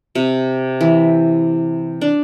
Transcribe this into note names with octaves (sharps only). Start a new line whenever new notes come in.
C3
E3
D4